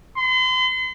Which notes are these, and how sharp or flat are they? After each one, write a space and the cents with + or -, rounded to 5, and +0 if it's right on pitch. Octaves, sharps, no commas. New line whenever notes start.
C6 -40